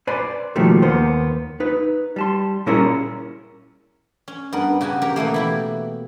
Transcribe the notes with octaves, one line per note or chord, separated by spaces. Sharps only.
B4 C5 D5 G#5 B5
B2 D#3 F3 G3 A3 A#3
D#2 A#3 B3 C5
D#4 B4
G3 A5 C6
A#2 G3 C#4 E4 G#4 A#4
C#4
G2 B3 A#4
C#3 F#4 G4 G#5 A5
G4 A#4 C#5
B2 E3 A3 A#3
E3 E4 G4